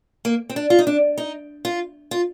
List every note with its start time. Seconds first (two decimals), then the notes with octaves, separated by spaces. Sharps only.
0.25 A#3
0.49 C4
0.56 D4
0.70 F4
0.79 D#4
0.87 D4
1.18 D#4
1.65 F4
2.11 F4